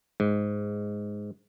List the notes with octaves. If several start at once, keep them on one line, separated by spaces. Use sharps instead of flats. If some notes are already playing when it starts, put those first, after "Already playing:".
G#2